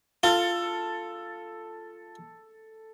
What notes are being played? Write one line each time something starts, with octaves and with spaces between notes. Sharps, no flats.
F4 A4